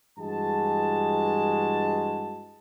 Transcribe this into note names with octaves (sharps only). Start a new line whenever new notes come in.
G2 E3 G#3 F#4 G#4 A5